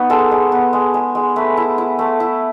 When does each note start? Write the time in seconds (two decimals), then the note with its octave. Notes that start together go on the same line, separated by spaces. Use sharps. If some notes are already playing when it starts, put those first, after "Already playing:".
Already playing: B3 D#4 F#4
0.10 G#3 A4
0.31 G#3
0.52 B3
0.73 G#3
0.94 G#3
1.15 G#3
1.36 A3 B4
1.57 E4
1.78 E4
1.99 A3
2.20 E4